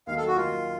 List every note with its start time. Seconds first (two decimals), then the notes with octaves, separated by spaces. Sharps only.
0.07 D#2 D#3 F#3 F5
0.17 A4
0.28 F#4
0.36 D#2 D#3 F#3 F4